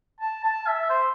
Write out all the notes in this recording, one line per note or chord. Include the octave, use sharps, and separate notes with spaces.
A5
A5
E5
C5